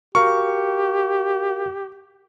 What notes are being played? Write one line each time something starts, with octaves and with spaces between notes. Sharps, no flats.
F#4 G4 A#4 F5 C#6